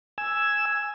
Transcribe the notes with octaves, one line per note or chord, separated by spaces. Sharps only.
G#5 E6